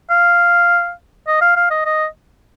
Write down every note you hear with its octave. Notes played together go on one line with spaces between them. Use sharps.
F5
D#5
F5
F5
D#5
D#5